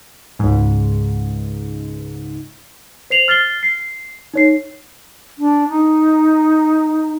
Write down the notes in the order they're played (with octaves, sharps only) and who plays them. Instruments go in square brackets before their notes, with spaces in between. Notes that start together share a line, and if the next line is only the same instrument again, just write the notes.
[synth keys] C#2 G#2
[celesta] C5 C7 F7 F#7
F6 A6 C7 G7
C7
D#4 C#5 C7
[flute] D4
D#4